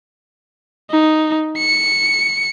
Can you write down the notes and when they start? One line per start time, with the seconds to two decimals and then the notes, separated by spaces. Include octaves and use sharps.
0.90 D#4
1.57 C#7